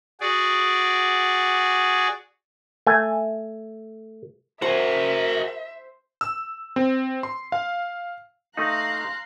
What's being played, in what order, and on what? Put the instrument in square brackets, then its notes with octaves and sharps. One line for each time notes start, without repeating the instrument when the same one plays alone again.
[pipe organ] F#4 G#4 D5
[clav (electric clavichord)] A3 G#5
[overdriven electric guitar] F#4 G#4 [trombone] A#4 [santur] C5 [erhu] E5
[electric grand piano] E6
C4
C6
F5
[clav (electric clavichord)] A3 D#4 [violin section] F5 C6 F#6 [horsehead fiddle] A#5